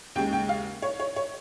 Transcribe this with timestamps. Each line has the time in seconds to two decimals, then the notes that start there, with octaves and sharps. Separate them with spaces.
0.15 D#2 C#3 G#3 G5
0.33 G5
0.49 F5
0.82 C#5
1.00 C#5
1.16 C#5